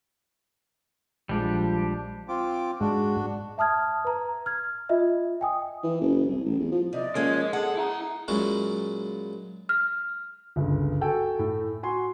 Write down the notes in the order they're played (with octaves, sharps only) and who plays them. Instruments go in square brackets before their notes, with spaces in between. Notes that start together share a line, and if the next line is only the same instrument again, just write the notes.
[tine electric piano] A#1 G#3 [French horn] F3 [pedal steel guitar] G3 D4 G4
[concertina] C4 F4 D6
[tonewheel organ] G#2 G#3 [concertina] D4 F#4
[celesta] E5 A5 D#6 F6 G#6
B4 A#5
F6 G#6
F4 D#5 E5
G5 G#5 D#6
[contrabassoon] E3
F#1
C2
A1
E2
F3
[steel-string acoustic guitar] C3 [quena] D5 [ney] D#5
[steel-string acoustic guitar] F3 A#3 C#4 [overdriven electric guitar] G#3 [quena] G#6
[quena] G#4 [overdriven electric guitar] A4 [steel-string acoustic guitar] F#5
[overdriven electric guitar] E4 A#5
[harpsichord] A#2 F#3 G#3 C#4 E4
[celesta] F6
[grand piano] G1 C#2
F#4 A4 G5 G#5
A2
F#4 G#5 C6